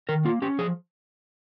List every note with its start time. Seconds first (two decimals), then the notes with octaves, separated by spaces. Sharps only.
0.09 D#3 A#4
0.25 A#3 F4
0.42 C#4 G4
0.59 F3 G#4